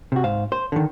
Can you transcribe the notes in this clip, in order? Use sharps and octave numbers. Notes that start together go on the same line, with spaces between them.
C3 F#4
G#2 C5 F5
C5
D3 D#3